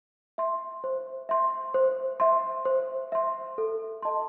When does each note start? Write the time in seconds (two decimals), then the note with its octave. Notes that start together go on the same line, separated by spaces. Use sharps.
0.38 E5 C6
0.84 C5
1.29 E5 C6
1.74 C5
2.20 E5 C6
2.65 C5
3.12 E5 C6
3.58 A4
4.02 D#5 A5 C6